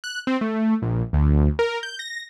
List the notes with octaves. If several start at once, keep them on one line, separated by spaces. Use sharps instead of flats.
F#6
C4
A3
A#1
D2
A#4
G6
A#6